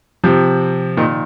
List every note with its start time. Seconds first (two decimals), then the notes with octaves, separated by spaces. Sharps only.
0.24 C3 F3
0.97 A#2 D#3